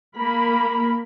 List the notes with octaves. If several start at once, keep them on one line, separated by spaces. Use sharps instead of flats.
A#3 A#4 B5